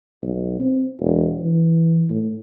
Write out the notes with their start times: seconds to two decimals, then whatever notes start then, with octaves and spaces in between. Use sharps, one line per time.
0.22 B1
0.60 C4
1.00 E1
1.39 E3
2.10 A2